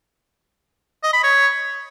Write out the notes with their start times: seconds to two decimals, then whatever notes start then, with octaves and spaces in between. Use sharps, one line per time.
1.04 D#5
1.13 B5
1.23 C#5